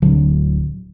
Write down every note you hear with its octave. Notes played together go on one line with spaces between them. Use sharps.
D1 D3 F#3